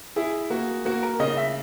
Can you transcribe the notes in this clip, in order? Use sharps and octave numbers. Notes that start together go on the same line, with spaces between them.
E4 G#4
A#3 F#4
A#3 F#4
A#4
C#3 D#5
E5